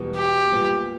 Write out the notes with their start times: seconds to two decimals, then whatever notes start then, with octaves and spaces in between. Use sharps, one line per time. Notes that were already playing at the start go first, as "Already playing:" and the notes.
Already playing: E2 B2 G3 B3
0.16 G4
0.52 A#2 G3 B3